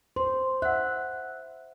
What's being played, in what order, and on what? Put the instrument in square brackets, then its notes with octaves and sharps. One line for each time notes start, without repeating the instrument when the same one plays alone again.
[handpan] C5 [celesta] C6
[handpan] E5 [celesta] F#5 F#6